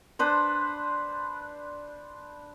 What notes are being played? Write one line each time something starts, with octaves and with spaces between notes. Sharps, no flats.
D4 B4 C5